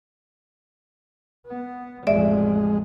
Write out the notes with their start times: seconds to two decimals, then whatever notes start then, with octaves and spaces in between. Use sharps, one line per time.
1.47 B3
2.07 A1 F2 G#3 D5 E5